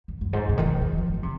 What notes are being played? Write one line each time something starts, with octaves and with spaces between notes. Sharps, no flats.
F#2
F#2
G#2
C3
D#3
C#3
D#3
F3
D#3
C3